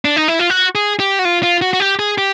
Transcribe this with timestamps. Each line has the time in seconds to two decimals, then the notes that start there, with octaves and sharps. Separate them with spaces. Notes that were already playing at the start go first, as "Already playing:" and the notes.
0.05 D4
0.16 D#4
0.28 E4
0.39 F4
0.50 F#4
0.75 G#4
1.00 G4
1.19 F#4
1.25 F4
1.43 F4
1.62 F#4
1.73 F#4
1.80 G4
1.99 G#4
2.18 G4